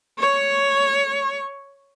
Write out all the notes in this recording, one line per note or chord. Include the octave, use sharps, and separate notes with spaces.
C#5 C#6